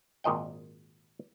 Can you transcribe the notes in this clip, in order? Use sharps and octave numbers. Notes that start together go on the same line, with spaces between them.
G#1 A#2 D#5 G5